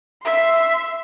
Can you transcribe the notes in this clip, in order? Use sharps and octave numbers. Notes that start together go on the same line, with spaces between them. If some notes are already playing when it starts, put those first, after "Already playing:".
E5 C6